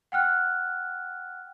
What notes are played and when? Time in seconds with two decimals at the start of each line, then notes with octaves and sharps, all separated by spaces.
0.12 F#5 G5 F6 F#6